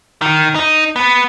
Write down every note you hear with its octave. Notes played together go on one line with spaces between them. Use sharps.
D#3
D#4
B3